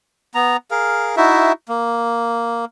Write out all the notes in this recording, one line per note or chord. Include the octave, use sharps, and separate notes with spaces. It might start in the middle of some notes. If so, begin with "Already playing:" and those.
B3 A#5
G#4 A#4 F5
D#4 E4 F#4 E5
A#3